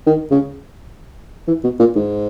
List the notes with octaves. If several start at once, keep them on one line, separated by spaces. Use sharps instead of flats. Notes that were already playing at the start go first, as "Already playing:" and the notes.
D#3
C#3
E3
B2
A#2
G#2